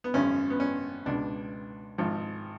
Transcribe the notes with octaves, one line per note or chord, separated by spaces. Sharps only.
B3
G#1 F#2 C#3 C#4
B3
C#4
C#2 B2 D4
G#1 G#2 F3